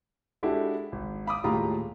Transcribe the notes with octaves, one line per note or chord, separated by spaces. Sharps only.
G#3 D4 E4 F#4 G4 A4
G#1
F5 B5 D6 D#6
D#1 A2 G#3 F4 G4 A#5